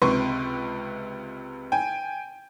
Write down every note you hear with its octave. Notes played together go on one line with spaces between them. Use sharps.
C#2 C3 B4 C6 C#6
G5 G#5